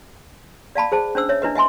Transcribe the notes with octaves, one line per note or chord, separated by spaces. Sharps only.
D5 F5 A5 B5
G#4 C5 A5
C#4 D4 C5 E6
C#5 E5
D4 E4 B4 D#5
D#5 E5 G#5 C6